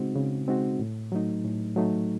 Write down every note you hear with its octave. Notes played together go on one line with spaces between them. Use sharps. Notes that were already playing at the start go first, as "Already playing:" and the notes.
Already playing: C#3 G#3 C4 D#4 F#4
C#3
G#3 C4 D#4 F#4
A2
F#3 A3 D#4
A2
F#3 A3 D#4